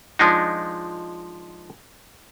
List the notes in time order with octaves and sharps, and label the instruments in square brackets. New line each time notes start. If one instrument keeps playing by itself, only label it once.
[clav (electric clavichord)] F3 G#3 D4 D#4